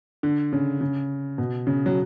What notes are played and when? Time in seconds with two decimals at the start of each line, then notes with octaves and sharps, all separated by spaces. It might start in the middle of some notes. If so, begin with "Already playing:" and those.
0.23 D3
0.53 C#3
0.81 C#3
1.38 B2
1.67 C#3
1.86 F#3